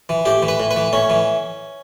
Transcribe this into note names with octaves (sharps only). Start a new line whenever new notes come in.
E3
A2 G4
E3
B4
A2
B4
E3
A2 C#4
E3